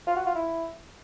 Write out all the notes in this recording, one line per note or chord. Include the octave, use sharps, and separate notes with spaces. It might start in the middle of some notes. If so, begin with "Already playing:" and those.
F4
F#4
F4
E4